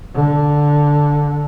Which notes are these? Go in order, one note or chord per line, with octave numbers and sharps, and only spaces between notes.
D3